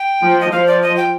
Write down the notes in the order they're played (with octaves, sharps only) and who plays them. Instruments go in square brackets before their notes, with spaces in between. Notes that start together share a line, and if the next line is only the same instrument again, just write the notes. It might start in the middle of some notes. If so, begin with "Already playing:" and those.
Already playing: [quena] G5
[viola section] F3
[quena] D#5
[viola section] F3 [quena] F5
[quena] D5
D#5
G5